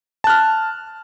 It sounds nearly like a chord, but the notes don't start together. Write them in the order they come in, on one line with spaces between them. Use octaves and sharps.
A5 F#6 F6